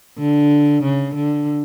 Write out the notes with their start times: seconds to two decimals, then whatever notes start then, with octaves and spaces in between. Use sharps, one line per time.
0.18 D3
0.83 C#3
1.15 D3